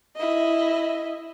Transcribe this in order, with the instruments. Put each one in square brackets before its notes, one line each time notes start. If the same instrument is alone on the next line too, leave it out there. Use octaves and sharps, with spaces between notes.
[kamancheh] E4 D#5